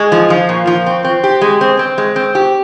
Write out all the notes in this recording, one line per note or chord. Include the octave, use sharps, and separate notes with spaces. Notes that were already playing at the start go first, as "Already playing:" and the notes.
Already playing: G#3
F3
F3
A#2
F3
C4
C4
G4
G#3
C4
C4
G#3
C4
G4